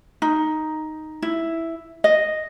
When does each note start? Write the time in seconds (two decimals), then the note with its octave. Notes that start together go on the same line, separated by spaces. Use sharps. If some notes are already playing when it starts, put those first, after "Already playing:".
0.22 D#4
1.22 E4
2.04 D#5